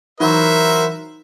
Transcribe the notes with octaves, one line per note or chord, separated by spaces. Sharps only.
E3 F#3 D#4 F#4 A#4 C5 E5